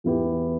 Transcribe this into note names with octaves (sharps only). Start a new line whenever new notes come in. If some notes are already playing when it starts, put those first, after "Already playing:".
E2 E3 B3 E4 G4